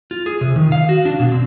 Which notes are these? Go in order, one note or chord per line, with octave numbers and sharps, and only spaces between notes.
F4
G#4
C3
D#3
F5
F#4
D4
B2
C4